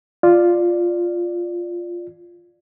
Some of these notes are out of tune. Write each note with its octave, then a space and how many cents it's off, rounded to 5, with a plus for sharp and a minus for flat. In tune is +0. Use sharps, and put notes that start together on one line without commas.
F4 +0 D5 +5